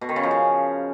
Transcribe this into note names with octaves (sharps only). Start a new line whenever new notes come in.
B2
D#3
C#3
F3
C#3